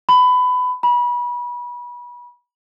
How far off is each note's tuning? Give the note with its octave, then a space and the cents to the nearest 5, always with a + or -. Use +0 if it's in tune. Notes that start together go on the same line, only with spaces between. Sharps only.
B5 +20
B5 -30